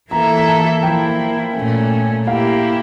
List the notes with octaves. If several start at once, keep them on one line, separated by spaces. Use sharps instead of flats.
E3 A#3 E4 A4 E5 A#5
A#5
A5
F3 A#3 E4 G5
A#2 A3 C#4
A#3 E4 G4 F5